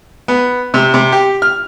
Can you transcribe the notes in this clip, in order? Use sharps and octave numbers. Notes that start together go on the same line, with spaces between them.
B3
C3
C3
G4
F6